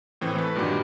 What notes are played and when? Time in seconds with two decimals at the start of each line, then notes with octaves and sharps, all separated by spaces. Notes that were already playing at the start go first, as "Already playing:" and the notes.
0.21 A2 E3 C4
0.36 A3 B4
0.55 G2 A#2 D#3 F#3 G3